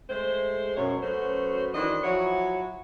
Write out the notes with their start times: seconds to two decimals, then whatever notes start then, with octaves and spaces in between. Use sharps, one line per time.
0.10 G#3 A3 C5
0.77 F#2 B2 C#5
1.03 F#3 A3 B3 C#4 F#4 C5
1.75 D#3 E3 C4 D4 F#4 D#5
2.04 F3 F#3 E4 F#4 C#5